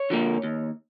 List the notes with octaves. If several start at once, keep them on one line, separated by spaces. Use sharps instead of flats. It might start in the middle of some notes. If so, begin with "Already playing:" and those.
Already playing: C#5
D3 F3 A#3
D#2